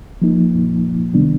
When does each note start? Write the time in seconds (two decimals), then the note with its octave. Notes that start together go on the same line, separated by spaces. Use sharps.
0.22 F3 A#3 D#4
1.14 C3 D#3 G3 B3 D4